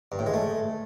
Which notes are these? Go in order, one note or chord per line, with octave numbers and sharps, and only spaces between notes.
G2
A2
G#3
A3